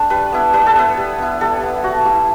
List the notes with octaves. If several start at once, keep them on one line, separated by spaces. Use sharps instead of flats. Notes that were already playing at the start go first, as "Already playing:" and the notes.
Already playing: A3 D4 G5 A5
G3 B4
B3 E4
G3 B4
A4
B3 E4 B4
G3
B3 E4
G3 A4
B3 E4
A3 F#4
E4 G4